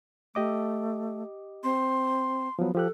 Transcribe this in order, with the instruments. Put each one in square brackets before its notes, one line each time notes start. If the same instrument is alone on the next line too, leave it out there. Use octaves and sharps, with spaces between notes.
[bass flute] A3 [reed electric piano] G4 D#5 D6
[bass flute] C4 [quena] C6
[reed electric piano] F3 F#3 [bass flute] B3
[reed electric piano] F3 G4 F#6 [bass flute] A4